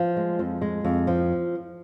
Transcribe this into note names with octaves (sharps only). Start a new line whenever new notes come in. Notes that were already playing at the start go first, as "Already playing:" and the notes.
Already playing: F3
G#3
F2
G#3
F2
F3